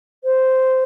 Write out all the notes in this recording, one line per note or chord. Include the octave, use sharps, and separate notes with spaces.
C5